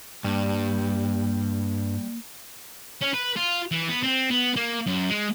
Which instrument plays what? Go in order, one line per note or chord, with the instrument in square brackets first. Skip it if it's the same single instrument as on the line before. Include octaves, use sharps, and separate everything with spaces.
[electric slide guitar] G2 [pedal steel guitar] G3 [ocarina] A#3
[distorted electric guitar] C#4
B4
F4
E3
B3
C4
B3
A#3
F#2
G#3